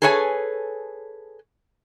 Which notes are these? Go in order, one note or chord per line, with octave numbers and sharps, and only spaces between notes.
G#4 A4 B4 C#5 E5 G#5